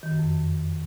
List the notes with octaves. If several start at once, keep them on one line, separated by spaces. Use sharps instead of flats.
D#3
F#2
F2